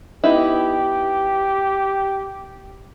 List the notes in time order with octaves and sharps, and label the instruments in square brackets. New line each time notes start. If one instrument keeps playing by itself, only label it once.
[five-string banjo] B3 D#4 E4 [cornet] G4